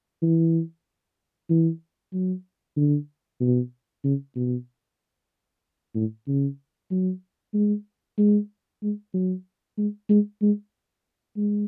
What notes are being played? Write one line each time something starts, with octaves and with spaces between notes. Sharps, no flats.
E3
E3
F#3
D3
B2
C#3
B2
A2
C#3
F#3
G#3
G#3
G#3
F#3
G#3
G#3
G#3
G#3